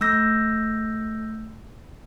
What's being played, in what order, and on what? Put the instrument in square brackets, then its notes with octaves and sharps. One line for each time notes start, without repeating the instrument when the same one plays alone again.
[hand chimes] A3 E6 G6 A#6